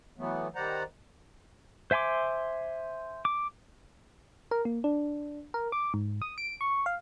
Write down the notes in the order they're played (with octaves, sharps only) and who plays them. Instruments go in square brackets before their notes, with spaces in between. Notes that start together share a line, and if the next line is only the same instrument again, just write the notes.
[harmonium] E3 F#3 A3 B3
D#3 G3 C5 D5 F#5 A#5
[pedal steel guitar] C5 E5 G#5 C6 D6
D6
[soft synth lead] A#4
A#3
D4
A#4
D6
G#2
D#6
D7
C#6
F5